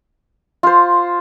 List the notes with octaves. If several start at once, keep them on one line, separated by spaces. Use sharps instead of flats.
F4 C5